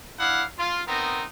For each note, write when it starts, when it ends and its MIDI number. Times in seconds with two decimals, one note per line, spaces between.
0.19 0.44 62
0.19 0.44 64
0.19 0.44 77
0.19 0.44 78
0.58 0.82 65
0.88 1.24 59
0.88 1.24 60
0.88 1.24 63
0.88 1.24 70